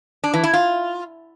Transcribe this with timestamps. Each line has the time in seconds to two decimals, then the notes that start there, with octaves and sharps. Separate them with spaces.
0.24 D4
0.34 E3
0.43 E4
0.53 F4